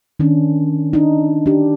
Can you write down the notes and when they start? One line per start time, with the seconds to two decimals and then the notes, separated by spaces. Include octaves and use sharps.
0.20 D#3 C#4 D4
0.93 D4 D#4
1.46 D4 G4